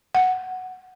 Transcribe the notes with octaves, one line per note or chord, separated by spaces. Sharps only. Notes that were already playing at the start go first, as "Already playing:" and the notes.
F#5